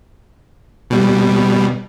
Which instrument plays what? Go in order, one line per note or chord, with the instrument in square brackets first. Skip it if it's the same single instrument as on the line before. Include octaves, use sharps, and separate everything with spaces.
[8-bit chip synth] B2 G3